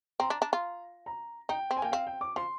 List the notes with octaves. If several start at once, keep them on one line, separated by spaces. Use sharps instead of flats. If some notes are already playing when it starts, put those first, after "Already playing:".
C4 A#5
D4
D4
F4
A#5
D#4 G5
C4
G#5
A#3 G5
C4 F5
G5
D6
F3 C6